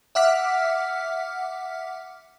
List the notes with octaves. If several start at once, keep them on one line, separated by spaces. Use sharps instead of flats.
E5 F#5 D6 F6 B6